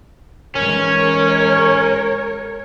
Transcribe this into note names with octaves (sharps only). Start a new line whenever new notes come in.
G#2 E3 G#3 C#4 A#4 C#5